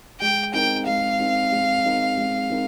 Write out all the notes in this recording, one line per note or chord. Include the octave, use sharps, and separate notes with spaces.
G#3 G5
C4 D#4 A#4 G5
G#3 F5
C4 D#4 A#4
G#3
C4 D#4 A#4
G#3
C4 D#4 A#4